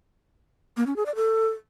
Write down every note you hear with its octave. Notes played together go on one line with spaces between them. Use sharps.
A#3
C#4
G#4
D5
A4